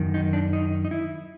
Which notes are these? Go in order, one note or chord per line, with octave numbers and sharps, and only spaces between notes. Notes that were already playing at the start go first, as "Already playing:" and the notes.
Already playing: F#2 D#3
D#4
D4
D#4
D#4
E4